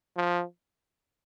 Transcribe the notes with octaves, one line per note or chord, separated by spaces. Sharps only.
F3